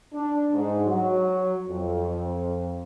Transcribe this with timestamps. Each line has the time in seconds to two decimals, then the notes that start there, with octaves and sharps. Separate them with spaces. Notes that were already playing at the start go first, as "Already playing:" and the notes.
0.13 D4
0.53 G#2
0.86 F#3
1.69 F2